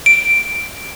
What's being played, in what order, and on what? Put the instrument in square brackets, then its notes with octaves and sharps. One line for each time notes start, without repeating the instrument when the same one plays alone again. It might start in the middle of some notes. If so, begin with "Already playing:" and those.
[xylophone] D7